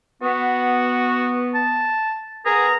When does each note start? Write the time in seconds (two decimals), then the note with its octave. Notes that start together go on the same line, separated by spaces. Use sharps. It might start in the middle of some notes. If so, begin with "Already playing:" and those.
0.22 B3 F#4
1.54 A5
2.45 B3 G#4 A#4 A#5